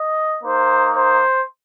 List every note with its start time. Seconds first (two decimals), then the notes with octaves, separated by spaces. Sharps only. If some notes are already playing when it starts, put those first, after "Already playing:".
Already playing: D#5
0.43 A#3 D#4 C5
0.95 C5